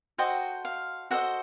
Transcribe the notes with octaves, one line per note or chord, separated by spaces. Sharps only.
F#4 A4 C5 D#5 G5
F5
F#4 A4 C5 D#5 F#5